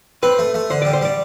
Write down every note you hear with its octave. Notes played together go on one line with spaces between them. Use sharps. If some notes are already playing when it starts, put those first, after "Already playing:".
C4 B4
A3
A3
D3 C5
G3 D5
C5
G3 D5